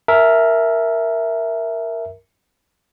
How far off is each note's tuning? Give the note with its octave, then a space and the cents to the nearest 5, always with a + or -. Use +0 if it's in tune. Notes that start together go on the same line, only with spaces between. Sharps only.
A#4 +0 E5 +0 A5 -45